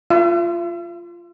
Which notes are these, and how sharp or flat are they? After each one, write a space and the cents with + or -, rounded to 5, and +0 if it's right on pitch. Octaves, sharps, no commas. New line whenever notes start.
F4 -10 E5 +45